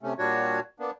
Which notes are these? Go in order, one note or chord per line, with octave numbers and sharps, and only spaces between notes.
C3 A3 C#4
A#2 G3 D4 F#4 C#5
A#3 B3 D4